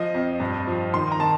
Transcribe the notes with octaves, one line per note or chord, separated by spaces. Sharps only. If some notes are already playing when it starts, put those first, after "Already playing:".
Already playing: F3 D#5
F2
G2
F3
D#3 C6
A#5
D#3 A5